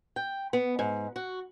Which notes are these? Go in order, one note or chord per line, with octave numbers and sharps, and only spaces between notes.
G5
B3
G#2
F#4